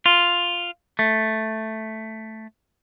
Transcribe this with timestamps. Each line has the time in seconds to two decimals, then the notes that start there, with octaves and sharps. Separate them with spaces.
0.06 F4
0.99 A3